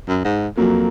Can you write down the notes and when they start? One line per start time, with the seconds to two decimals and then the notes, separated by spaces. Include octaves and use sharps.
0.08 F#2
0.25 G#2
0.57 F2 F#3 A#3